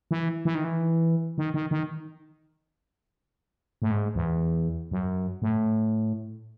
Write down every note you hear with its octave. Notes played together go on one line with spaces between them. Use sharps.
E3
E3
D#3
E3
D#3
D#3
D#3
A2
G#2
E2
F#2
A2